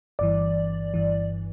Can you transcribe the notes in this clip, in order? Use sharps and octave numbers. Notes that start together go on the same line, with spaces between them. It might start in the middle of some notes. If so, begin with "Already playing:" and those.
G1 G2 E3 D5
G1 G2 E3